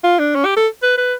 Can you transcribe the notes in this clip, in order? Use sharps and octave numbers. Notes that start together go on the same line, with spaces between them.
F4
D4
C#4
G4
A4
B4
B4